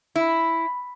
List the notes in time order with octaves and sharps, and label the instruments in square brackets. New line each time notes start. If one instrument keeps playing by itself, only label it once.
[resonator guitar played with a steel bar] E4